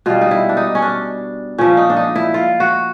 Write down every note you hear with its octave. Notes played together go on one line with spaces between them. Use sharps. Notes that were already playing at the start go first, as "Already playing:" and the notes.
B2 G3 F4
D#4
E4
D4
D#4
C#4
D4
A#2 F3 C#4
D#4
D4
D#4
E4
F4
F#4